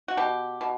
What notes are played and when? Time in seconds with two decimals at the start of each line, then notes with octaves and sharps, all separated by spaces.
0.08 F#4
0.17 B2 G4
0.61 B2